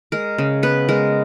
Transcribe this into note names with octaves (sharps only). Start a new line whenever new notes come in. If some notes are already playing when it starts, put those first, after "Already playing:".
G#3 A#4
C#3
B3 B4
G#3 A#4